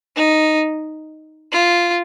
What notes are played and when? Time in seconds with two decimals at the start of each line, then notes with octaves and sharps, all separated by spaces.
0.16 D#4
1.52 F4